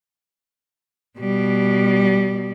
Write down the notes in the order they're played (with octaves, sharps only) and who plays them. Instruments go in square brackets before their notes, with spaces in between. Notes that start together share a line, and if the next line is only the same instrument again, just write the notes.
[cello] B2 G3